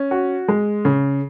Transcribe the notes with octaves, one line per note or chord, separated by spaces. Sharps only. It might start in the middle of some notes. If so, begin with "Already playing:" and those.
Already playing: C#4
F#4
G#3
C#3